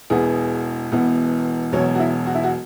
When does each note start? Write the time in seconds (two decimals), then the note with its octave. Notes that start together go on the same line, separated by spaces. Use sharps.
0.10 E1 E2 E3 B3 G#4
0.92 E1 E2 E3 B3
1.72 E1 E2 B2 F#3 B3 C#5
1.95 F#4
1.99 E4
2.26 F#4
2.35 E4
2.44 F#4